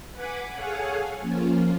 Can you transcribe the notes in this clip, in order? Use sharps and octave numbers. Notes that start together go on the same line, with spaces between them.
B4 F#5 G#5 B5 D6
G#4 A4 C#5 F5 F#5 G#5
F3 A#3 C#4 F4